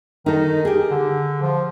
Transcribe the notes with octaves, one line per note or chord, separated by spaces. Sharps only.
D#3 D#4 A4
G4 G#4
D3
F3